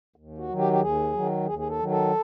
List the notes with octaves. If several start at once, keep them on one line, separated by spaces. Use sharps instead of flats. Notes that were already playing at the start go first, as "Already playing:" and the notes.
D#2
F#4
D#3 F#3
G4
G4
D#2 G#4
D#3 F#3
D#2 G#4
G#4
A4
D#3 F#3
A4